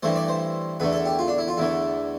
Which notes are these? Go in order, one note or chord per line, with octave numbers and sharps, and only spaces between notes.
G2 E3 A3 C5
D5
C5
E2 D3 A3 B4
A4
G4
F4
D4
E4
F4
E2 D3 A3 E4